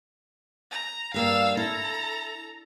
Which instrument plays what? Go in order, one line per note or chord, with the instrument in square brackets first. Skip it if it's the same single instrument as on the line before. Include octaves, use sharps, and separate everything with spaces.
[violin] A#5
[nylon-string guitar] G2 A#3 D5 [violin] F5 E6
[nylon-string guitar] E4 [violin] A4 A#5